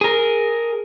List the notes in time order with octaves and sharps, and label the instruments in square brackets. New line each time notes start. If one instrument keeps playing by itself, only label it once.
[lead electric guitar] G#4 A#4